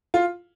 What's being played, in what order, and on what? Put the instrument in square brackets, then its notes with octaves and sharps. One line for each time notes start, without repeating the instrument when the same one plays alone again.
[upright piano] F4